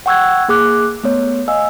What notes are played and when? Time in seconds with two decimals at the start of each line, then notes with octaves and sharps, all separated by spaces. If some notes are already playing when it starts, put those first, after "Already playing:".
0.06 F#5 G5 C#6 E6 F#6 G#6
0.48 A#3 G#4 D6 F#6
1.04 A3 B3 C#5
1.48 D#5 F5 G#5 E6